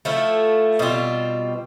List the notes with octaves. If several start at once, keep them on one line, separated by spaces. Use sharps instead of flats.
F3 A3 E4
B2 G3 C4 F4